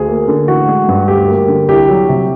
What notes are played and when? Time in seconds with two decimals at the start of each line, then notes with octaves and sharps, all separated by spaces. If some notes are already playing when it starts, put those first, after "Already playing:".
Already playing: D2 G#4
0.08 A#3
0.28 D3
0.48 A1 F#4
0.68 G#3
0.89 G2
1.08 D2 G4
1.28 A#3
1.48 D3
1.68 C2 G4
1.88 F#3
2.09 C3